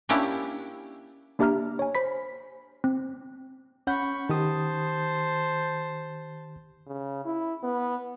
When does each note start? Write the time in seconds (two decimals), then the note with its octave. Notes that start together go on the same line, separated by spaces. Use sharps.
0.09 A#3 C#4 D4 E4 G4
1.39 A#3 D4 G4 E5 A#5 F6
1.79 C#5 G#5
1.95 C5 B5 B6
2.84 C4
3.87 C#4 F#5 B5 C#6 G6
4.29 D#3 G4 C5 A5 D#6
6.87 C#3
7.25 E4
7.63 B3